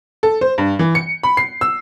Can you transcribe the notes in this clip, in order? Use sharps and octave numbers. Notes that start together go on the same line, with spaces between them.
A4
C5
G2
E3
C#7
B5
C7
E6